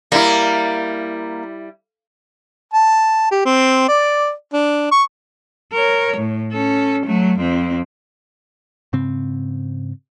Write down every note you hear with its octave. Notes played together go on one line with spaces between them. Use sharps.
G3 A#3 E4
A5
G4
C4
D5
D4
C#6
A#4 C#5
A2
C#4 A4
F#3 A3
F2 C4
G#2 C#3 C4